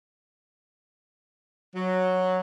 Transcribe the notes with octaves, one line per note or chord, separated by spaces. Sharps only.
F#3